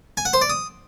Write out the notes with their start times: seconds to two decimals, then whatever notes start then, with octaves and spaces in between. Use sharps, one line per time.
0.17 G#5
0.25 F#5
0.33 C5
0.42 D5
0.50 D#6